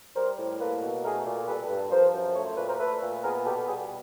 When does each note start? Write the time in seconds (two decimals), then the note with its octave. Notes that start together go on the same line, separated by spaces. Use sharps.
0.16 G3 A#4 C5
0.38 A2
0.60 A#3 A4 B4
0.82 B2
1.04 A3 G#4 A#4
1.26 A#2
1.47 G3 A4 B4
1.69 G2
1.91 F3 A#4 C5
2.14 F#2
2.35 A3 C#5
2.46 C5
2.56 A#2 B4
2.67 A#4 C5
2.79 A3 A4 B4
3.02 A#2
3.23 B3 G#4 A#4
3.45 B2 G4 A4
3.67 G3 F#4 G#4